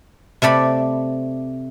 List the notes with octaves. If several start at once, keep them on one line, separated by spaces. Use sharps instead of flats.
C3 A3 D5 B5